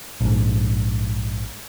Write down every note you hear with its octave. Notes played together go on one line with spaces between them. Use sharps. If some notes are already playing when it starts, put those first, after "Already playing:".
A#1 G#2